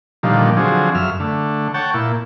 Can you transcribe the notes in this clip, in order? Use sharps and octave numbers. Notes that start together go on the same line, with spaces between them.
A#2 D3 D#3 F3 G3
D3 F3 F#3 C4 G#4
F#2 E5 F6
D3 A3
C#5 F#5 G5 A5
A#2 E4